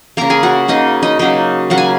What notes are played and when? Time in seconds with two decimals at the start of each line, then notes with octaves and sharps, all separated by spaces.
0.17 C#3 A#3 A#4 A#5
0.30 G#4 G#5
0.43 F#4 F#5
0.68 C#3 A#3 D#4 D#5
1.03 D#4 D#5
1.19 C#3 F#3 A#3 D#4 D#5
1.70 C#3 F#3 A#3 F#5
1.78 G#5